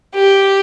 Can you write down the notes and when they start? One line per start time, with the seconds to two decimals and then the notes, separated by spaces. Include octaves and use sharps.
0.15 G4